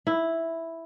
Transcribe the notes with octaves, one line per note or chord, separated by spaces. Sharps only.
E4